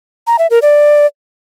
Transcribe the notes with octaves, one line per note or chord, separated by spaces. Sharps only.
A#5
E5
A#4
D5